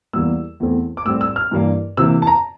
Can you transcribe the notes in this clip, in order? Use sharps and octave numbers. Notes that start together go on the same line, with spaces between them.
E2 E3 G3 A#3 E6
E2 E3 A3 C4
D6
A2 G3 C4 E6
E6
F6
G2 E3 G3 A#3
C3 E3 A#3 E6
A5
A#5